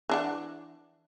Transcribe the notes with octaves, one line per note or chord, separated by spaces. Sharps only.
E3 D4 F#5